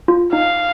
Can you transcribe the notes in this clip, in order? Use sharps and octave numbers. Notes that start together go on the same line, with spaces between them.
F4
D#4 F5